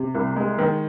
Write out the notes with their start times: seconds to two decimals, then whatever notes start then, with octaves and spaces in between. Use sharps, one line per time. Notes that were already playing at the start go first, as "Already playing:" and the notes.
Already playing: C3
0.15 C2
0.36 G#3
0.59 D#3